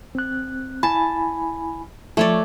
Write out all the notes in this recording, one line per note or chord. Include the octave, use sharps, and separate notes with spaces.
C4 F#6
E4 G#5 A5 B5
F3 A3 C#5 D5